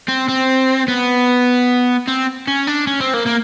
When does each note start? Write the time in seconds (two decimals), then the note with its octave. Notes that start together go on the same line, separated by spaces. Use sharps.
0.09 C4
0.29 C4
0.88 B3
2.08 C4
2.47 C#4
2.67 D4
2.87 C#4
3.00 C4
3.14 A#3
3.27 A#3